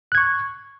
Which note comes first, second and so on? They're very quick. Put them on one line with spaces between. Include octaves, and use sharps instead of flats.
F#6 G#6 C#6